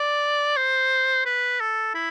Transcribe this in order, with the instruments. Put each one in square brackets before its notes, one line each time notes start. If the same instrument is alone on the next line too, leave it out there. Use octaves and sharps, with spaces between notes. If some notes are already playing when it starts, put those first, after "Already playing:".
Already playing: [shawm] D5
C5
B4
A4
E4